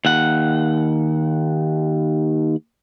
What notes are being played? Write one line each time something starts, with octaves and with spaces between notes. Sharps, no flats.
D#2 F#5